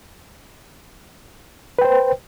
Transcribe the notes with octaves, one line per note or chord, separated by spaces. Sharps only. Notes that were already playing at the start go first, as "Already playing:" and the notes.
B4 C5 G5